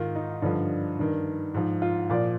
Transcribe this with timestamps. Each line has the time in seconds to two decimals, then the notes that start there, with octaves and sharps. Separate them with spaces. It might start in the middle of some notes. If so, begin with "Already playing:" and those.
Already playing: G#2 D#3 F4
0.15 D#4
0.42 G2 D3 F3
0.99 G2 D#3
1.54 G#2 F3
1.82 F4
2.10 A#2 F3 D5